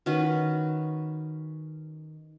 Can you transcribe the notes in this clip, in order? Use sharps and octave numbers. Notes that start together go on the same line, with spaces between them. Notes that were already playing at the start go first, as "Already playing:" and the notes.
D#3 C#4 F#4 B4